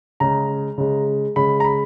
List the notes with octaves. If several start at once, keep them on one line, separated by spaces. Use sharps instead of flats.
C#3 G#3 A#5
C#3 G#3
C#3 G#3 B5
A#5
B5